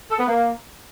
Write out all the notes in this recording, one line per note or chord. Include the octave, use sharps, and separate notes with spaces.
A4
B3
A#3